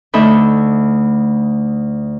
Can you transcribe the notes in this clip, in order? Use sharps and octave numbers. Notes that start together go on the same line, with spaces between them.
D2 A3 D#4 E5 B5